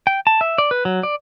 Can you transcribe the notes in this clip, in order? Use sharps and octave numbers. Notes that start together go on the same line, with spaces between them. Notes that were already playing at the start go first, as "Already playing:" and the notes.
G5
A5
E5
D5
B4
F#3
D5